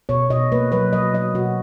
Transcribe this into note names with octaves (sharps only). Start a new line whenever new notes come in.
B2 C#5
B2 D#5
A#3 B4
F#3 B4
F#3 D#5
F#3 D#5
B2 F#4